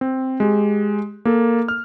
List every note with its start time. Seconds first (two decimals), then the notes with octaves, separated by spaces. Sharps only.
0.01 C4
0.40 G#3 G4
1.25 A#3 A4
1.68 F6